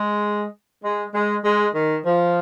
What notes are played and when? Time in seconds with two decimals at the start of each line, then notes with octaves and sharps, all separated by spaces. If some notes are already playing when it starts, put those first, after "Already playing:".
Already playing: G#3
0.83 G#3
1.14 G#3
1.44 G#3
1.74 D#3
2.05 F3